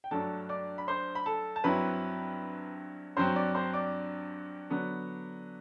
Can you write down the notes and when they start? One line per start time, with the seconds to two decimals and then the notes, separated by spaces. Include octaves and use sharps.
0.04 G5
0.11 G2 F#3 A3 D4 A4 A5
0.49 D5 D6
0.78 B5
0.88 C5 C6
1.15 B5
1.26 A4 A5
1.56 A5
1.64 G2 F#3 C4 E4 B4 B5
3.17 G2 F#3 C4 C5 C6
3.36 D5 D6
3.55 C5 C6
3.74 D5 D6
4.70 D3 F#3 B3 D4